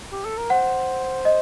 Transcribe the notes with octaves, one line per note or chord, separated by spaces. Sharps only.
G4
A4
A#4
C5 F#5
D#5